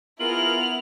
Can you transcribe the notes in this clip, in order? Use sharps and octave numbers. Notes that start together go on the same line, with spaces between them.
B3 E4 F4 G#4 A#4 F6 F#7